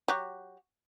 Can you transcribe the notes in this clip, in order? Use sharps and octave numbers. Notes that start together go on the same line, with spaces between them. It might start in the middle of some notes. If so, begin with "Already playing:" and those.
F#3 F#4 G4